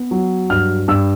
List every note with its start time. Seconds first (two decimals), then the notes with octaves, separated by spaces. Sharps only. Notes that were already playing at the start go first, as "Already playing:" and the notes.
Already playing: B3
0.11 F#3
0.50 G2 F6
0.88 G2 E6